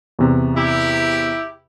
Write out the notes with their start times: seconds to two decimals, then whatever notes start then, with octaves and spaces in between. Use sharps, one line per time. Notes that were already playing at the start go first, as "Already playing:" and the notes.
0.19 E2 C3
0.56 E4 G4